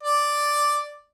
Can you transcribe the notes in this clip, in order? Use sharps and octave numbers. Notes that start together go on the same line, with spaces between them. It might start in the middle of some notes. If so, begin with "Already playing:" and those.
D5